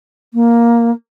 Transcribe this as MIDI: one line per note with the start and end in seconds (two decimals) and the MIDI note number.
0.33 0.91 58